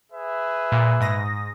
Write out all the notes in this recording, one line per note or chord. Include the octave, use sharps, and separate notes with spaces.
G#4 B4 E5
A#2
G#2 D#6 A#6